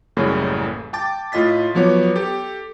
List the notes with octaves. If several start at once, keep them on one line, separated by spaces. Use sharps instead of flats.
A1 F#2 A2 C#3 G3 A#3
G5 A5 D6 A6
A2 F4 D#5 A6 B6
F3 F#3 B3 C#5 D6
G4 A4